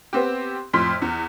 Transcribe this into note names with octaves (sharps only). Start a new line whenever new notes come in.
B3 C4 G4
F2 A2 C6 F6 B6
E2